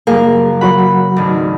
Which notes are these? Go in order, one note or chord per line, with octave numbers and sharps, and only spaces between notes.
F#1 G3 A#3 G#4
F#3 F#4 F#5 B5
G#1 D2